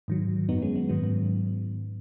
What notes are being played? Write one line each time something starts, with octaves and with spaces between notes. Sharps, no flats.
G#2 D#3 F#3
F#2 F#3 B3 D#4
G#3 C#4
B3
G#2 D#3 F#3 B3
B3